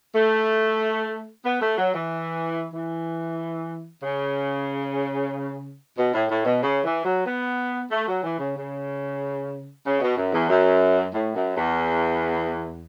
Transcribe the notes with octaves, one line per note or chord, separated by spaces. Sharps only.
A3
B3
A3
F#3
E3
E3
C#3
B2
A2
A2
B2
C#3
E3
F#3
B3
A3
F#3
E3
C#3
C#3
C#3
B2
F#2
E2
F#2
A2
F#2
E2